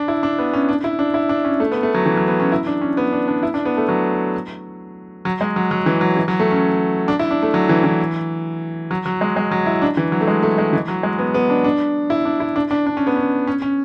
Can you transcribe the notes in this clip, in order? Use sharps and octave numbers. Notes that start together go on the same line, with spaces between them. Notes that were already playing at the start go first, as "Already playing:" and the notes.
Already playing: D4
E4
D4
B3
C#4
D4
E4
D4
E4
D4
C#4
A3
B3
A3
F#3
E3
F#3
B3
C#4
E4
D4
C#4
B3
D4
D4
E4
D4
B3
A3
F#3
F#3
G#3
F#3
F#3
E3
F#3
E3
F#3
A3
C#4
D4
E4
D4
A3
F#3
E3
E3
F#3
F#3
G#3
G#3
F#3
E4
D4
E3
F#3
A3
G#3
A3
G#3
E3
F#3
G#3
B3
B3
D4
D4
E4
D4
E4
D4
D4
D4
C#4
B3
C#4
C#4
C#4